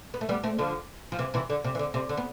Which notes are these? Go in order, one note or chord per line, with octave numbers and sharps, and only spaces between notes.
B3
A3
G3 B3
A3 C4
D3 F3
F3
C3 E3
C3 E3
D3
C3
E3
D3
C3
D3
B3